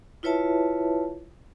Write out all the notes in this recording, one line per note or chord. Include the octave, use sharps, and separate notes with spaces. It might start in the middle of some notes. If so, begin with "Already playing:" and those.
E4 F4 B4 C#5 E5 A5